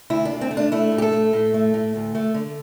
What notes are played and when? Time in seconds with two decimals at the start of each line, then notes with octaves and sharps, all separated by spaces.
0.10 D2 E4
0.25 D4
0.32 D2
0.41 C4
0.51 A3
0.57 D4
0.72 A3 E4
0.92 A2
0.98 G4
1.02 A4
1.12 A3
1.33 A2
1.54 A3
1.74 A2
1.95 D2
2.15 A3
2.34 D3